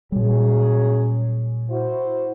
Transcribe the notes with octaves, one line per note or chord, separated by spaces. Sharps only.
A#2 F#3 G3 C#4 G#4
E4 F#4 C5